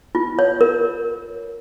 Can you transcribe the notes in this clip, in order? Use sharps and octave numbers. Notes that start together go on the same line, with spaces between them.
F4
C#5
A#4